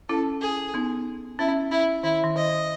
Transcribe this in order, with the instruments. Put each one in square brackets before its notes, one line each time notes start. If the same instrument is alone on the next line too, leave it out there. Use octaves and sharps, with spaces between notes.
[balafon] C#4 E4 [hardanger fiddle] A4
[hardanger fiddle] G#4
[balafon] B3 D#4
[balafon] C#4 [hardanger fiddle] E4
[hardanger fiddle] E4
[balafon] D#3 [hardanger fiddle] E4
[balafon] D#3
[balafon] D#3 [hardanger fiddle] D#5